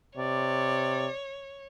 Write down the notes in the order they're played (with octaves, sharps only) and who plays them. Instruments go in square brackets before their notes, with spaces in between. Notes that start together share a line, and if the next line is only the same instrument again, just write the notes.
[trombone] C3 [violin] C#5 [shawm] D5